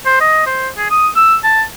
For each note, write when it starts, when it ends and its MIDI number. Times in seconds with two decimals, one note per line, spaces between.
0.05 0.20 72
0.21 0.44 75
0.46 0.68 72
0.78 0.90 68
0.90 1.08 87
1.16 1.36 88
1.44 1.62 81